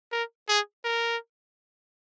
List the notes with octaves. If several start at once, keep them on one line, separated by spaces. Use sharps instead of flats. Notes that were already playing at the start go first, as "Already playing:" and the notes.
A#4
G#4
A#4